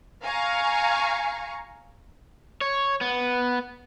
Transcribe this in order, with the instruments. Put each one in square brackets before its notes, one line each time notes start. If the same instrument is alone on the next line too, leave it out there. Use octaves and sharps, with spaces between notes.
[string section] F5 G#5 A#5 C#6
[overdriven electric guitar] C#5
B3